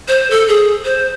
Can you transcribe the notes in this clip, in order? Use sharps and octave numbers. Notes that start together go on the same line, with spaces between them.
C5
A4
G#4
C5